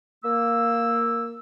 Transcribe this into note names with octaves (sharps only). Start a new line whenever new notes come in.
A#3 E6